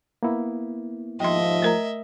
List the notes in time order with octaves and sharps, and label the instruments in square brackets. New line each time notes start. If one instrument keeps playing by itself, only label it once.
[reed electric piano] A#3 B3 E4
[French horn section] D#2 G#2 F3 [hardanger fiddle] D#5 E5 [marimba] G5 C6
[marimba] A3 A#4 A#5